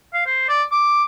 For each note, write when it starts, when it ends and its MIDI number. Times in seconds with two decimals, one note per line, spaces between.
0.14 0.21 77
0.26 0.48 72
0.49 0.63 74
0.71 1.03 86